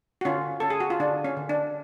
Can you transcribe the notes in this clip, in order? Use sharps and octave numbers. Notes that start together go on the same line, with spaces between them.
F#4
D3 C#4 F4
C#4 A4
G#4
F#4
F4
D3 D4
C#4
D3
D4